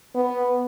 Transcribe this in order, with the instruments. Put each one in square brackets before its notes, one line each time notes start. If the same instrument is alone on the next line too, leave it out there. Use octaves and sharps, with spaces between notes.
[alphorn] B3